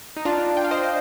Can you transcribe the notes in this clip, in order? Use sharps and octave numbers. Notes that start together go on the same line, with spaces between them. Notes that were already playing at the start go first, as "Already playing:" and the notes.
D#4
D4 F4
G5
F5
C5 D#5